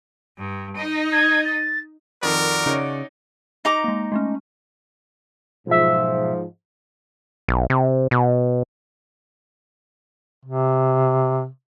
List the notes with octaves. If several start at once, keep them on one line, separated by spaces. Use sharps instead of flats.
G2
D#4 D#5
G#6
A6
F2 D#3 F#4 A#4 D5
C#3 C#4 D#4
D#4 A#5 D6
G#3 A#3
G#3 A3 C#4
B1 G#2 F3 E5
B1
C3
B2
C3